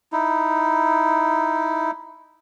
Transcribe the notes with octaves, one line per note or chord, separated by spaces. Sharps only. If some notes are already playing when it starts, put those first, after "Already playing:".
D#4 E4